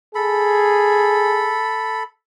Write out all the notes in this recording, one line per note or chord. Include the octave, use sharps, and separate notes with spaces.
G#4 A4 B5